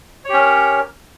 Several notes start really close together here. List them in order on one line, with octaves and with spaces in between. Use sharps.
C#5 G4 C#4 A#4